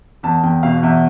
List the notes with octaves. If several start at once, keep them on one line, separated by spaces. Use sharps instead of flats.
E2 A5
E2 G5
B2 F5
E2 E5